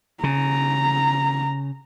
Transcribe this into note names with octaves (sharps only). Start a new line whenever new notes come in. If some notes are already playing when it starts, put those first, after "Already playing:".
C#3 A#5